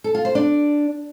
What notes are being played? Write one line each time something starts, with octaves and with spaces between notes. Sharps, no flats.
A4
F4
C5
D4